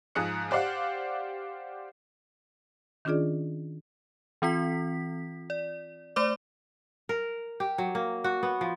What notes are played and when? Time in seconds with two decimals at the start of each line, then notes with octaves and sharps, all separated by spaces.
0.15 G#2 F3 G#4 D#6 F#6 C#7
0.51 G4 C5 D5 F5 F#5
3.05 D#3 C#4 D4 F4 G#4 D5
4.42 E3 C4 F4 B6
5.50 D5
6.16 A3 C5 D5 D6
7.09 A#4
7.60 G4
7.78 F#3
7.95 A#3
8.24 F#4
8.43 B3
8.61 F3